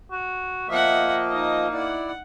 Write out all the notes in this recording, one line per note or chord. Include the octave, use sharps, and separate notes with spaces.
F#4
F3 A#3 D#5 E5 F#5
D#4 D#6
E4 D5 F#5